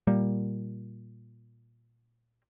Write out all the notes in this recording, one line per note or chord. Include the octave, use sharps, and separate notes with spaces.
A#2 G3 A#3